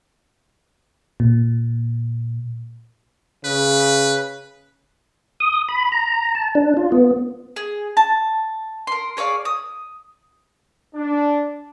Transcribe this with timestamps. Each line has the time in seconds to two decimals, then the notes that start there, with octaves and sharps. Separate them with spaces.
1.20 A#2
3.44 C#3 B4
5.40 D#6
5.69 B5
5.92 A#5
6.35 A5
6.55 D4
6.77 F4
6.92 B3
7.56 G#4
7.97 A5
8.87 A#4 C6
9.17 G#4 C#5 D5 F5
9.45 D#6
10.95 D4